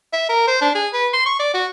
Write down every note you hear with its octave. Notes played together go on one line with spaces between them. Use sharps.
E5
A#4
C5
D4
G#4
B4
C6
C#6
D5
F#4